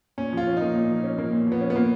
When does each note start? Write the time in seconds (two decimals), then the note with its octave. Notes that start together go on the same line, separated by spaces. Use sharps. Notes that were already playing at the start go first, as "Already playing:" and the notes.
0.18 A#2 C#4
0.32 F3 F4
0.47 C#4
0.57 A#3 D#4
0.76 A#2
0.90 F3
1.04 C#4
1.18 A#3
1.33 A#2
1.47 F3 B3
1.61 C#4
1.70 B3
1.76 A#3